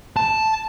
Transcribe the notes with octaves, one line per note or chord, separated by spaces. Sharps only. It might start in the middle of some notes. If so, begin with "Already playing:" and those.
A5